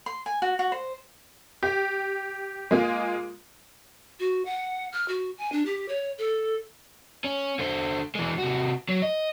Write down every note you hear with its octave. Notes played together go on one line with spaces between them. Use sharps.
C6
G#5
F#4
F#4
C5
G4
G#3 A#3 F4
F#4
F#5
F6
F#4
G#5
D4
G4
C#5
A4
C#4
D3 C5
E3 G#3
C3 F#4
F#3
D#5